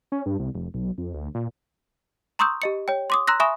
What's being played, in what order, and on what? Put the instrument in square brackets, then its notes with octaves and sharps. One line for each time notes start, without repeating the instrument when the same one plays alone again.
[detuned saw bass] C#4
G2
C2
F1
B1
F2
D2
A#2
[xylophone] A#5 C6 C#6 D#6 E6 G6
G4 D#5 C#7
C#5 G5
C6 D6 D#6
A#5 C6 E6 F#6 A#6
E5 G#5 B5 C#6 D#6 E7